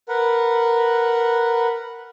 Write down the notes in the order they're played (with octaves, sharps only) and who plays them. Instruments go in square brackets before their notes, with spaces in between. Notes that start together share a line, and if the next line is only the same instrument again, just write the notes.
[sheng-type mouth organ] A#4 B4 F#5